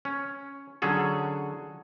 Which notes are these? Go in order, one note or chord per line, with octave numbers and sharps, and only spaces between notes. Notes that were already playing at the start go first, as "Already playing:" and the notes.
C#4
D3 F#3 C#4 G#4 A4